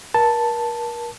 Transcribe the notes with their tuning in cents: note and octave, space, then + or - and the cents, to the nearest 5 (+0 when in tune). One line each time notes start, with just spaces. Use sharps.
A#4 +35 A5 +0